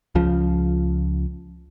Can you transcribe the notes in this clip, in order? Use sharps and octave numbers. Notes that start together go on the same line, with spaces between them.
C#2 C#3 F3